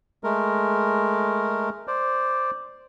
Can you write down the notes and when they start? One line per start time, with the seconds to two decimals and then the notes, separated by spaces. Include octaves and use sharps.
0.24 G#3 A3 A#4
1.87 C5 D5